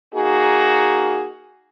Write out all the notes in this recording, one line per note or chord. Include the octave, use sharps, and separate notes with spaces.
A#3 D#4 F#4 G#4